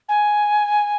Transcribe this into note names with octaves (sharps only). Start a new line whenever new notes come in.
G#5